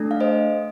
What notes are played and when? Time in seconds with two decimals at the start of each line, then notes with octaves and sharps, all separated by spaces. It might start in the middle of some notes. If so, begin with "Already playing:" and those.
Already playing: A3 D4 A4
0.11 F5
0.20 C5 D#5